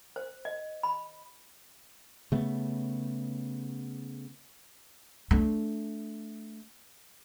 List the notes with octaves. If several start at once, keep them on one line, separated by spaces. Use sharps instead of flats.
C5
D#5
B5
C#3 A3 B3
A3 D4